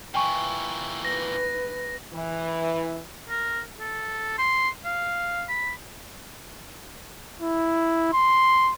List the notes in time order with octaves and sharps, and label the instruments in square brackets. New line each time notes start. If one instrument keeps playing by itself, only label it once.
[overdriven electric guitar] A#2 E3 [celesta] G5 G#5 C#6
[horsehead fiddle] B4 [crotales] A#6
[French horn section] E3
[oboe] A#4
A4
C6
F5
B5
[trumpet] E4
C6